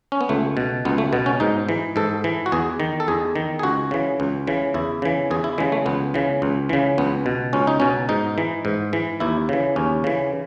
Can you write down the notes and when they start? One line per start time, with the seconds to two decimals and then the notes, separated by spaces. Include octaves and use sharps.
0.12 C#4
0.21 B3
0.29 C#2 A3
0.57 B2
0.85 C#2 B3
0.98 A3
1.13 B2 B3
1.26 C#4
1.40 G#2 D#4
1.69 E3
1.96 G#2 A4
2.24 E3
2.46 F#4
2.52 E2 G#4
2.80 D#3
3.00 A4
3.08 E2 G#4
3.36 D#3
3.59 G#4
3.63 C#2 F#4
3.91 C#3 E3
4.20 C#2
4.47 C#3 E3
4.74 E2 E4
5.02 C#3 E3
5.31 E2 G#4
5.44 E4
5.58 C#3 E3 G#3
5.72 A3
5.86 C#2 B3
6.14 C#3 E3
6.42 C#2
6.69 C#3 E3
6.98 C#2 B3
7.26 B2
7.53 C#2 C#4
7.67 D#4
7.80 B2 C#4
8.09 G#2 D#4
8.38 E3
8.65 G#2
8.93 E3
9.20 D#2 E4
9.49 C#3 E3
9.76 D#2 C#4
10.04 C#3 E3